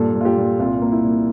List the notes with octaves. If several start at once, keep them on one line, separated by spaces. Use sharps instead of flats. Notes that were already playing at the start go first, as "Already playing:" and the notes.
Already playing: G2 A#2 A4
A#2
F4
G4
A#2
C2 F4
A#3
E4
A#2